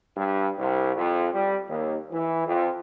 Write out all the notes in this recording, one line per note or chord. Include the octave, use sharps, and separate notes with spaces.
G2
C2
F2
G3
D#2
E3
F2